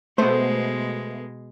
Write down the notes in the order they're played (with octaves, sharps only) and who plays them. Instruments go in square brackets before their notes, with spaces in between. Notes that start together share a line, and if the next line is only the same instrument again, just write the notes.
[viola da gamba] B2 G#3 [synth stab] A3 B3 [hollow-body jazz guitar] C5